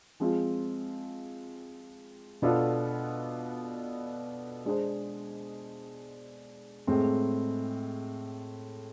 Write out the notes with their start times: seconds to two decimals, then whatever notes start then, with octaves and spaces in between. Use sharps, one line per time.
0.20 F3 G#3 C4 F4
2.42 B2 B3 D4 F4 A4
4.65 G#3 D4 G#4 C5
6.87 A2 G#3 C4